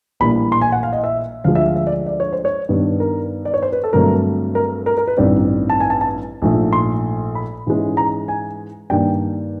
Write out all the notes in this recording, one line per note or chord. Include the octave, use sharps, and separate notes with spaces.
A#1 A2 E3 G3 A#3 B5
C6
G#5
F#5
F5
D#5
E5
D2 D3 F3 G#3 F5
E5
F5
E5
D5
D5
C#5
C5
C#5
G2 D#3 G3 B3 D4
A#4
D5
C#5
C5
B4
A4
G2 D3 F#3 A3 C4 A#4
A#4
A#4
A#4
B4
A1 G2 D#3 G3 C4 D5
A5
G#5
A5
A5
A#1 G#2 F3 A3
C6
B5
G#2 E3 G#3 C#4
A#5
G#5
G2 D#3 G3 A#3 D4 G5